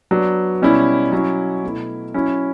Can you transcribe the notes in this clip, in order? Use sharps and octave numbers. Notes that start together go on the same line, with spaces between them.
F#3 B3 D4
B2 G3 C#4 E4
F#3 C#4 E4
B2 A3 E4
F#3 C#4 E4